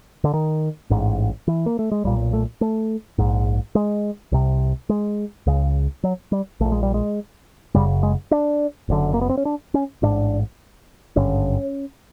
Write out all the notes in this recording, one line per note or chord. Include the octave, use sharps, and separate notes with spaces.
D3
D#3
A1 G#2
E3
A#3
A3
G#3
B1 A#2 G3
A3
A3
A#1 G#2
G#3
C2 C3
G#3
C#2 C#3
F#3
G3
A#1 A#2 A3
G#3
G3
G#3
F#1 F#2 C#3 G3
G#3
D4
F#1 F#2 D3
A#3
B3
C4
C#4
D4
C#4
A1 G#2 D4
G#1 G2 D3 C#4